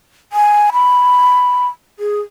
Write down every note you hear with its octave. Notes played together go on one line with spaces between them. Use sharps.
G#5
B5
G#4